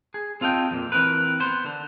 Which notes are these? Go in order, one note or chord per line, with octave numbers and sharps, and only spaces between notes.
G#4
C4 F4 A4 D#5 G5
F2 A#2
E3 C4 A#4 B4
B3 C5
D3